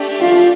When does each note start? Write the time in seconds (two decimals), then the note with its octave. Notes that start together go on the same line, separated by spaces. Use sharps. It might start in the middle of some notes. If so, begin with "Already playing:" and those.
Already playing: A3 D4 G4
0.20 F4